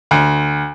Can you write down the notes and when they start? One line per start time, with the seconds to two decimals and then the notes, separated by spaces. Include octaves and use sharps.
0.11 D2